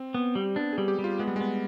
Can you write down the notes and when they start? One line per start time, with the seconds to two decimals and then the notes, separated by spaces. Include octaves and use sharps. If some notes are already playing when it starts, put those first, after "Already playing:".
Already playing: C4
0.14 B3
0.35 G3
0.56 B3 D4
0.73 G#4
0.78 G3
0.88 G4
0.99 G3
1.04 F4
1.19 G#3 B3
1.28 G3
1.36 G#3 B3